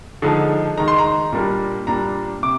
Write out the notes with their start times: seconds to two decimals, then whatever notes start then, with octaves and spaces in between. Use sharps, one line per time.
0.22 D3 F3 G#3 D#4
0.78 D#3 G#3 D#4 A#5
0.88 C6
0.98 A#5
1.32 A#2 G3 A#3 D4 F4
1.87 A#2 G3 D4 A#5
2.43 C3 D6